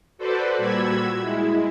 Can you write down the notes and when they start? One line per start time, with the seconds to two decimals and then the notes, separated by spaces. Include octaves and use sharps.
0.18 F#4 A4 B4 C5 D5
0.58 A#2 G3 F#4 B5 E6 G#6
1.21 G#3 E4